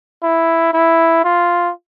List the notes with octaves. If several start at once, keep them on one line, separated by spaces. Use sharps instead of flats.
E4
E4
F4